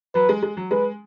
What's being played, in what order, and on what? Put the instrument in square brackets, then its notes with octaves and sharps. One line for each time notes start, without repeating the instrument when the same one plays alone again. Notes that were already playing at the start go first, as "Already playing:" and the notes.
[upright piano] F#3 [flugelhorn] B4
[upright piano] G#3
G#3
F#3
[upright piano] G#3 [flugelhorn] B4